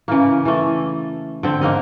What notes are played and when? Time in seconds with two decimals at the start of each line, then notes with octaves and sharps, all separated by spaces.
0.08 C#3 E3 A#3
0.45 E3 A3
1.43 D3 C4
1.61 G#2 A#3 A#4 D#5